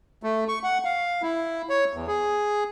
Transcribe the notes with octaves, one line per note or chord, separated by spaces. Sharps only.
A3
C#6
F#5
F5
E4
C#5
E2
G#4